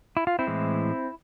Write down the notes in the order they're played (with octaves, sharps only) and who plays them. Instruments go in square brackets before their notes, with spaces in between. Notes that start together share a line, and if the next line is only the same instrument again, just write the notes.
[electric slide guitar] E4
F4
C4 E4
A2 E3 G#3